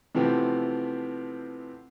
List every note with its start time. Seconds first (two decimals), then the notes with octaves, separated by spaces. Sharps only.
0.15 C3 E3 F3 A3 B3 C4